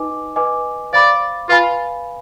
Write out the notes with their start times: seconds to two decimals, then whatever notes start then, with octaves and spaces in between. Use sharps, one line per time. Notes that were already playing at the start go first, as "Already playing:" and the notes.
Already playing: D#4 B4 D#5 G#5 D6
0.36 B4 D#5 G#5 D6
0.93 C5 D5 F5 B5 D6
1.49 F4 B4 F5 G#5 B5